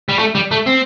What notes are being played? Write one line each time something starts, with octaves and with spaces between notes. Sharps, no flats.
G3
A3
G3
A3
C4